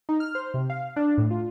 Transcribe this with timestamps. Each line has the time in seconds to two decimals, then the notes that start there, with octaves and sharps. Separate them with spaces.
0.09 D#4
0.20 F6
0.35 C5
0.54 C3
0.70 F5
0.96 D4
1.18 A2
1.31 F4